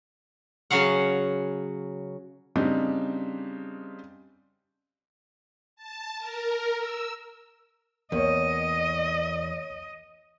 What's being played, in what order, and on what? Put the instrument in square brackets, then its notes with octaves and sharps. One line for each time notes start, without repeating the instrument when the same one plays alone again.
[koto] C#3 F#3 C#4 F5 F#5
[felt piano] C#3 G3 C4 D4 D#4
[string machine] A5
A#4
E6
[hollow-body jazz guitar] E2 [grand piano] A#3 C#5 [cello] D#5